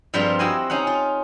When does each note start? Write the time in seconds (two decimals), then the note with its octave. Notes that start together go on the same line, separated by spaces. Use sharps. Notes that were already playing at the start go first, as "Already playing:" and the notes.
0.14 G2 F3 G3 C4 F4 A#5
0.39 C4 E4 F#4 D#5 G#5 C6
0.70 C#4 D#4 F5 F#5
0.87 F4